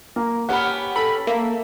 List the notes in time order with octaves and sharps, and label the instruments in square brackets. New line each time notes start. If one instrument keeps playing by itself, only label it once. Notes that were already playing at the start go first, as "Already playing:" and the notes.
[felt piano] A#3
[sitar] B3 C#4 G4 [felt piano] F#5 B5
[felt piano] A4 [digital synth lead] B5
[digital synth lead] A#3 [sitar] E5